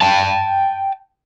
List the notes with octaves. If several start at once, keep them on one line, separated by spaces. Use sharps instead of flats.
G5 A5